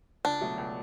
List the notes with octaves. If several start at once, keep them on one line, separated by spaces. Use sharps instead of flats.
C#2 D4
B2 F#3 A3
C#2